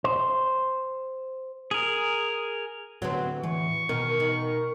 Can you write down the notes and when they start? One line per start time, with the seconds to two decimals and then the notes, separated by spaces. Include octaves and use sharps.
0.04 C5
1.71 G#4 A#4
3.02 A2 D3 F#3 B3 C4
3.43 E2 E3 C#6
3.89 B2 D#3 A#4
4.20 D#3